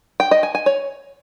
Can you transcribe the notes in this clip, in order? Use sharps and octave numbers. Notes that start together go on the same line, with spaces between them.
G5
D#5
G#5
G#5
C#5